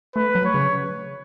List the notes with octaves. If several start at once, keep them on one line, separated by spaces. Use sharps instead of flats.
A3 B4
F#3
C#5
C#3